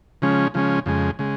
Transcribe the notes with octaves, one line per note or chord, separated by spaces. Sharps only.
C#3 F3 G#3 C#4
C#3 F3 G#3 C#4
F2 C#3 G#3
C#3 G#3